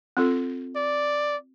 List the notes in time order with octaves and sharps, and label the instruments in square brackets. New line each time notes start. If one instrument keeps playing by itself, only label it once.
[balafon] C4 F4 A4
[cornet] D5